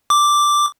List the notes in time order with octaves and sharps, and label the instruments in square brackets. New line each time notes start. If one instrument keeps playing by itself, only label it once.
[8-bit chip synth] D6